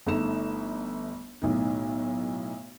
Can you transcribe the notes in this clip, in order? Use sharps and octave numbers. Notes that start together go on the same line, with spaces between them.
G1 A3 D#4 E7
B1 A2 D#3